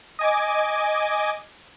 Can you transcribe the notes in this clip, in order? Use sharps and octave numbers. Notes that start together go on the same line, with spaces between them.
D#5 G#5 D6